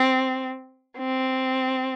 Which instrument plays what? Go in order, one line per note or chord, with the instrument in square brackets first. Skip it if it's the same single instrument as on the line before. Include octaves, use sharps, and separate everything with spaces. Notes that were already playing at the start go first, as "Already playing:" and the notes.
Already playing: [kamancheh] C4
C4